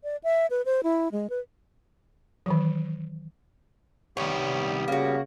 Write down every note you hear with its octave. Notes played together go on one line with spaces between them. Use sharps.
D5
E5
B4
C5
E4
G#3
B4
D#3 E3 F#3
C2 D#3 G3 B3 G4 C#5
C#3 A#3 F#4